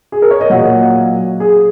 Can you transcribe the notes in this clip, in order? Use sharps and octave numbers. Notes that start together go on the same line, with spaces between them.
G#4
A#4
C#5
D#5
A#2 F#3 A#3 F#5
G#4